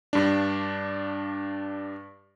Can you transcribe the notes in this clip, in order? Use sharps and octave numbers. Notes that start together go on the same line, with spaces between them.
G2 D4